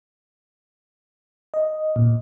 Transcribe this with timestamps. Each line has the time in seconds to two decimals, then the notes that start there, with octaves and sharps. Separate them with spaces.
1.54 D#5
1.96 A#2